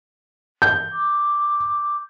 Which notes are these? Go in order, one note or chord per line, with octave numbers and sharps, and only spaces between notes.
G6
D6